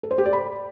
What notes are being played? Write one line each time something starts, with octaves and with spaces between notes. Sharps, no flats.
A4
C5
G4
D5
B5